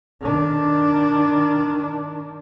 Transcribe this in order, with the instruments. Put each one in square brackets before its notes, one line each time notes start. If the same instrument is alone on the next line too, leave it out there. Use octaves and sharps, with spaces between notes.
[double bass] D#3 D4